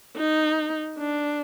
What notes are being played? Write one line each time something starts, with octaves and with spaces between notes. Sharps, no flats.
D#4
D4